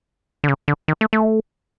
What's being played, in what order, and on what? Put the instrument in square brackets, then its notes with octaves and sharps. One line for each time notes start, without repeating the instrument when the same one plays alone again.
[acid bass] D3
C#3
D3
D#3
A3
A3